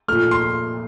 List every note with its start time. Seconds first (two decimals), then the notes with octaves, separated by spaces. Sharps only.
0.08 A#2 F3 A3 F6
0.31 C6